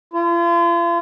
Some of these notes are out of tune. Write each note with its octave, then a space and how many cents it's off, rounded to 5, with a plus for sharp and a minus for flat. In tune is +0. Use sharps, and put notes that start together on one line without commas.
F4 -40